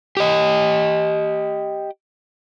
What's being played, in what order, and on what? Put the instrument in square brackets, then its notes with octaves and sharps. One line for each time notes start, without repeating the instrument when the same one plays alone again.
[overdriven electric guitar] G4 D#5